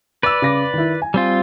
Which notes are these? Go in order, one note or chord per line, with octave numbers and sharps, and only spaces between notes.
B4 D5 D6 E6
C#3 D6 A#6
D#3 E4
G#5
G3 C4 F4